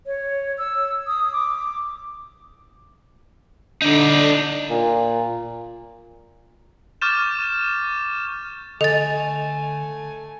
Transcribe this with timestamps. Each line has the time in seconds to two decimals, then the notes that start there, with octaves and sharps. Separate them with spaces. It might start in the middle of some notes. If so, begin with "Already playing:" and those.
0.06 C#5
0.58 E6
1.07 D#6
1.32 D6
3.82 D3 D#4 D5
4.70 A#2
7.02 C#6 D6 F6 G6 A6 E7
8.81 D3 A3 A4 D#5 G#5 A6